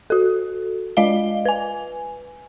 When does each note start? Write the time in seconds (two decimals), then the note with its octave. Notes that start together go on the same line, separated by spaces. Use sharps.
0.10 F#4 A4
0.97 G#3 F4 D5 D#5 F5 G7
1.45 B4 G#5